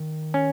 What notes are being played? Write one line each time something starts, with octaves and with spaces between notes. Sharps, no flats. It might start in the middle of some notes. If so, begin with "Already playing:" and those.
Already playing: D#3
C#4